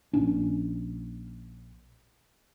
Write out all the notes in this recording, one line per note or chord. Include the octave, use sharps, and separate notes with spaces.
A#1 A#2 C#4 D4